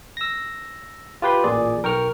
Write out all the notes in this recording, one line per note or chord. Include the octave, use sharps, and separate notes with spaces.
E6 A#6
F4 G4 B4 G5 C6
A1 A#2 G#4 D5
B1 A#4 G5 C#6 F6